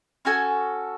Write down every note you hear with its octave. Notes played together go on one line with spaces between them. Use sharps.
C#4 F#4 A4 G#5